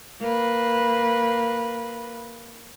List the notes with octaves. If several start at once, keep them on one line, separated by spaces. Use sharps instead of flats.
A#3 B4